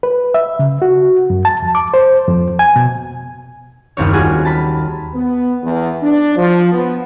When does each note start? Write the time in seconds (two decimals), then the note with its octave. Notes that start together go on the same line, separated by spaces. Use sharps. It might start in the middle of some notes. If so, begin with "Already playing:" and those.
0.03 B4
0.34 E5
0.59 C#3
0.82 F#4
1.30 F#2
1.45 A5
1.62 F2
1.75 D6
1.94 C5
2.27 F2
2.59 G#5
2.76 B2
3.97 F#1 D#2 C4 C#5
4.13 G3 F4 F#4 G#4
4.45 A5 B5
5.14 B3
5.62 E2
6.02 D4
6.36 F3
6.71 B3